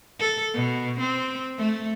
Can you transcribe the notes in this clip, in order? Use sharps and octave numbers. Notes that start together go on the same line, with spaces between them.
A4
B2
C4
A3